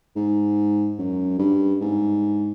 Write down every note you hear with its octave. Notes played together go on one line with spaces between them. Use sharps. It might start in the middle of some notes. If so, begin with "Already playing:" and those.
G#2
F#2
G2
G#2